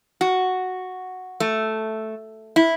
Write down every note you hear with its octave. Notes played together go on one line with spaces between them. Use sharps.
F#4
A3
E4